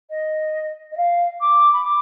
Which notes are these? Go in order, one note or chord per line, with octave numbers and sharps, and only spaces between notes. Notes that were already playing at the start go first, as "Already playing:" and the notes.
D#5
D#5
F5
D6
B5
D6